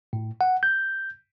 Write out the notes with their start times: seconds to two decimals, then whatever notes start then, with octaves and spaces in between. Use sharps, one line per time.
0.13 A2
0.41 F#5
0.63 G6